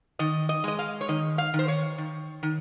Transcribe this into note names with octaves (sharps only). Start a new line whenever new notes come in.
D#3 D#5
D#5
G#3 D#5
F5
C#5
D#3 D#5
F5
D#3
C5
C#5
D#3
D#3